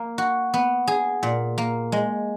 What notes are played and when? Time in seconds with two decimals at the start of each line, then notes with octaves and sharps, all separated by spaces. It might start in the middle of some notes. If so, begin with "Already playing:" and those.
Already playing: A#3
0.18 F#4
0.54 B3
0.87 G#4
1.23 A#2
1.58 A#3
1.92 G#3